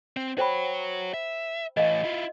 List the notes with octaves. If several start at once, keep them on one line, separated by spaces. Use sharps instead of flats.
C4
F#4 C5 C#5 G5 B5
E5
A2 E3 D#5 F5
E4 F4